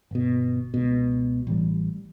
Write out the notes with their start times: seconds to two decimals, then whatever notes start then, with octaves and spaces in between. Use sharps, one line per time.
0.11 G1 B2
0.74 C#2 B2
1.47 A1 A2 E3 G3